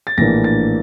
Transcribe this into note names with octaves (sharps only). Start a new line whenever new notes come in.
A6
A#1 A2 E3 A#3 D4 A#6
A6